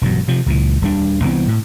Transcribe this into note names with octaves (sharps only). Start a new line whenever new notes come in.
E1 G2 F#3
C3 F3
C#2 A#2 E3
D#1 G3 D4
C2 E3 B3 C4
A2